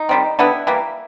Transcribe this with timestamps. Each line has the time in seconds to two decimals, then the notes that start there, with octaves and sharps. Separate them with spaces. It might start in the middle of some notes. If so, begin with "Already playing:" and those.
Already playing: D#4
0.09 D#3 G3 C4
0.39 D3 G3 B3 E4
0.67 E3 G3 A#3